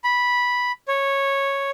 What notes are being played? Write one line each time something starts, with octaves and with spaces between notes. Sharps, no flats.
B5
C#5